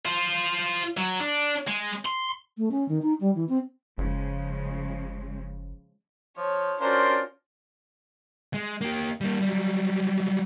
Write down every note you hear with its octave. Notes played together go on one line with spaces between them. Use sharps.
F4 C5
F#3
D4
G#3
C6
A3
C#4
D#3
D#4
G3
E3
C4
F#1 C#3 F3 G#3
F3 C#5
C#4 D4 F4 F#4 A#4 C5
G#3
A#3 G4
G3 A#3
F#3 G3